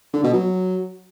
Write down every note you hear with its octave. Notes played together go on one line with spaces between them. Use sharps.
D3
B2
F#3